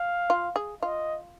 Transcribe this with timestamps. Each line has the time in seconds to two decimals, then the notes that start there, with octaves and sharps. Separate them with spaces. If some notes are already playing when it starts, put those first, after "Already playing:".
Already playing: F5
0.30 F4
0.56 G#4
0.82 F4 D#5